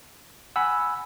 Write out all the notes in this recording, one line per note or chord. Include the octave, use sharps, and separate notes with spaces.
F#5 G#5 B5 E6